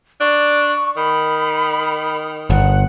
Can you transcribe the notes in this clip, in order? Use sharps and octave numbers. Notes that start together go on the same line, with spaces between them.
D4 C#6
D#3 B5
G1 F#5